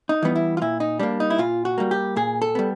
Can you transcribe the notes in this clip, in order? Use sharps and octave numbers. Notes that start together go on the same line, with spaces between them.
D#4
E3 G3 B3
E4
F4
A#2 E4
D#4
G3 A#3 D4
D#4
E4
A#2 F4
F#4
G3 A#3
G4
A#2 G#4
A4
G3 B3